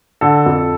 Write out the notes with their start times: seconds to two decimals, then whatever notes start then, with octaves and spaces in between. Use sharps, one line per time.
0.21 D3 A4
0.46 F2